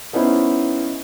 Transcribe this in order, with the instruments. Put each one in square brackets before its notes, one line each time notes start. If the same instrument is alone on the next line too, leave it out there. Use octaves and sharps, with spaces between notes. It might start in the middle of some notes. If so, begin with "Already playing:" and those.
[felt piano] B3 C#4 D#4 E4 C5